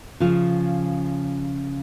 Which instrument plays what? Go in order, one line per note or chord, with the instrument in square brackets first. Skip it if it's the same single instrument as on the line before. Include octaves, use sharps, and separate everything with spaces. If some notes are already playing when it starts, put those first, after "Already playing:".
[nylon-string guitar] C#3 F3 F4